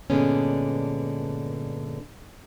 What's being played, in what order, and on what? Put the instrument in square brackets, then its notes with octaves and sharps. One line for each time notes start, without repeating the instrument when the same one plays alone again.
[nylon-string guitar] G2 A#2 D3 G#3 B3 C#4